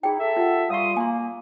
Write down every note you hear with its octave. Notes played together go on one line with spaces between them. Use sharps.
D#4 E4 G#4 G5
A4 E5
F4 G4 F#5
G3 F5 C6 C#6 D#6
A#3 G#5 C6